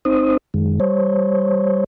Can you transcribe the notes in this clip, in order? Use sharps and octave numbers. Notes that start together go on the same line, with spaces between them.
C4 D#4 C5 D#6
F#2 D#3 G#3
G3 C5 C#5